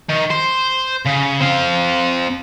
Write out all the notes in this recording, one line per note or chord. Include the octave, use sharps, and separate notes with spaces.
D#3
C5
C#3
C4 F5